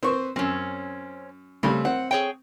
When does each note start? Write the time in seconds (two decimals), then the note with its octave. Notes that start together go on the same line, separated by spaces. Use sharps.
0.03 C4 B4 C5 C#6
0.36 F#2 C4 C#4
1.63 C#3 G3 A3 C4
1.85 C4 F#5
2.11 G#4 C#5 G5